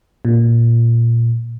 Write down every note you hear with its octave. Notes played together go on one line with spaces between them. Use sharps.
A#2